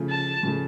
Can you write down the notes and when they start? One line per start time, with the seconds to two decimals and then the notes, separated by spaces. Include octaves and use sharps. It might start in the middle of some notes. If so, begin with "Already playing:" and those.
Already playing: C#3 F3 A3
0.10 A5
0.43 C#3 F3 A3